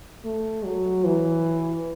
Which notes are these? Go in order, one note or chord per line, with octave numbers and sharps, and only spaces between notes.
A3
F#3
E3